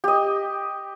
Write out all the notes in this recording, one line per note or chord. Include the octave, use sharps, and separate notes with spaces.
G4 D#5